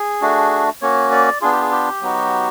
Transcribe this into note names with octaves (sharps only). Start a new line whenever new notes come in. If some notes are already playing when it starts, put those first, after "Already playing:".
Already playing: G#4
A3 D4 F#4
A#3 C#4 F#4 C#5
D5
B3 D4 F4 G#4
G4
G#4
G4
F#3 B3 D#4 F#4